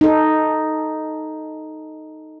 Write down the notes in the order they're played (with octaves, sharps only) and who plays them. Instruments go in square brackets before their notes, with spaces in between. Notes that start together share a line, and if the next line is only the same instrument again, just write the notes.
[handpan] D#4 A4